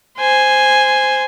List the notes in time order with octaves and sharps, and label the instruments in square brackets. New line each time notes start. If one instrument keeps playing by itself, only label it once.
[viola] C5 G#5